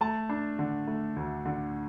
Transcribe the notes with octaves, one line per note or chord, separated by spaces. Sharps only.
A3 A5
D4
D3
A3
D2
D3